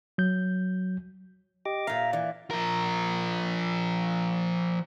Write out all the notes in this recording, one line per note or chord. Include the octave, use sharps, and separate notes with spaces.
F#3 G6
G4 D#5 D6
A#2 E5 F5 A#5
E3 D5
F3 A#4